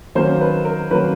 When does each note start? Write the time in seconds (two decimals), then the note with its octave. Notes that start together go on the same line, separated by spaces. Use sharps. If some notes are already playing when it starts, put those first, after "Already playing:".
0.15 D#3 F#3 A#3 C#4 C5
0.41 B4
0.65 A#4
0.91 D#3 F#3 A#3 C#4 B4